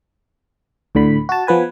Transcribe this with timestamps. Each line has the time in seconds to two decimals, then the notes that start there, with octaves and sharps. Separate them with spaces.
0.95 D2 A2 D3 B5
1.29 F#4 A5
1.47 F3 B3 B4 G#5